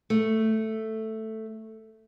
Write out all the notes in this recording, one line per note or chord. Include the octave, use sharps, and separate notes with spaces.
A3